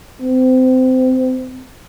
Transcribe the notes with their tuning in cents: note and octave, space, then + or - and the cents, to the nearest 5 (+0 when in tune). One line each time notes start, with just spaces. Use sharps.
C4 -25